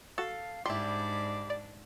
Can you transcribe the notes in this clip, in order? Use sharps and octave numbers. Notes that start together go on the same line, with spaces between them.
F#4 A4 F5
G#2 G3 D4 E4 C6 D6
D5